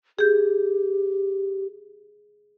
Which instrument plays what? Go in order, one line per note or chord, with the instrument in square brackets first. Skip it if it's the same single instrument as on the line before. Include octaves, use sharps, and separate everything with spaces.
[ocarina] G4 [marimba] G#4 G6